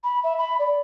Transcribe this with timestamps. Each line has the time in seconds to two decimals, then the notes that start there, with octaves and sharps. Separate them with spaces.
0.03 B5
0.23 E5
0.38 B5
0.59 D5